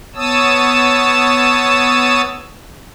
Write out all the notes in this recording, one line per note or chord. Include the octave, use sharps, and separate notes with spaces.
B3 C#5 A5 D#6 E6